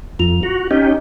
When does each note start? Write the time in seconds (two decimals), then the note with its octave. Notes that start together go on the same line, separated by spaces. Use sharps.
0.19 F2 F4 F7
0.43 F#4
0.71 C#4 D#4 G4 D#5